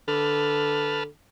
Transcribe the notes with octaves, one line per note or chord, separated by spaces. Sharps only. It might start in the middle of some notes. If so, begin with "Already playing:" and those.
D3 B4 A5 F6